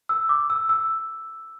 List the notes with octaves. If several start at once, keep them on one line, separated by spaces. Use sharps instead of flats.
E6
D6
E6
E6